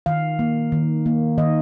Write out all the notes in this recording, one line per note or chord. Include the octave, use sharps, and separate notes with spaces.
D#3 F5
A#3
D#3
A#3
D#3 D#5